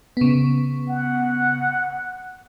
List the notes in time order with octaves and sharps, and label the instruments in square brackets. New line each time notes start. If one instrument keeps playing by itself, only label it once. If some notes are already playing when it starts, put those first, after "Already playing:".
[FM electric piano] C#3 B3
[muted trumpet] F#5